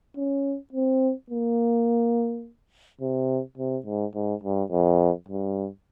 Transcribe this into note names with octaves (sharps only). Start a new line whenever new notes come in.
C#4
C4
A#3
C3
C3
G#2
G#2
G2
F2
G2